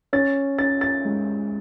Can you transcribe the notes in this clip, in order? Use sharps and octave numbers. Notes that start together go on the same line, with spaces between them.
C#4 A6
C#4 A6
A6
G#3